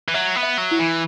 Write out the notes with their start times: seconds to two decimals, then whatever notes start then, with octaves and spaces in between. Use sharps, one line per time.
0.08 E3
0.14 F#3 E5
0.36 B3
0.43 E5
0.58 F#3
0.71 E4
0.79 E3